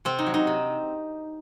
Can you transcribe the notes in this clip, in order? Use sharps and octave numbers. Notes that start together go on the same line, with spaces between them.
C3 C4
D#4
F#3
D#4
C3